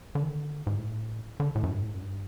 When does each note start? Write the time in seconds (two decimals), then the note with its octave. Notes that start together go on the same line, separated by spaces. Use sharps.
0.15 D3
0.23 D#3
0.29 D3
0.67 G#2
0.77 A2
1.40 D3
1.55 A2
1.63 F#2
1.71 G2
1.81 A2
1.86 G#2
1.95 F#2
2.02 G2